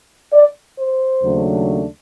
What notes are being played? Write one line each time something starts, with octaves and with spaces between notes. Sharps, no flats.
D5
C5
D#2 C#3 F#3 A3 D4